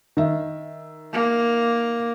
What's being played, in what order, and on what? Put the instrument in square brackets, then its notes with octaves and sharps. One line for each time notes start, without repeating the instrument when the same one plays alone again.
[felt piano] D#3 E5
[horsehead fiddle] A#3